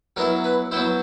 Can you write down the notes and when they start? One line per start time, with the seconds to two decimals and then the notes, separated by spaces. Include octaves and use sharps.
0.16 F#3 B3 E4 A#4
0.44 B4
0.71 F#3 B3 E4 C5